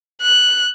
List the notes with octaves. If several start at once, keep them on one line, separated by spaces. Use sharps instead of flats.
F#6